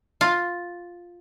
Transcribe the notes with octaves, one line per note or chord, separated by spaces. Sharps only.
F4